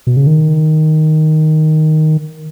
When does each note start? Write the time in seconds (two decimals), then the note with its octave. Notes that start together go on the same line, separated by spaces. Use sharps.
0.07 B2
0.16 C#3
0.27 D#3